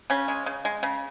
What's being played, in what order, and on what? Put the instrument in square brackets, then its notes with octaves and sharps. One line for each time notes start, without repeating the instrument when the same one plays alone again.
[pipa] C#3 C#4
G#3
C#3
G#3
C#3